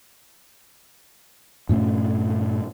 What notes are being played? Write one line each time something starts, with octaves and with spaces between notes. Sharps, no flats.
G2 A#2 A3 C#4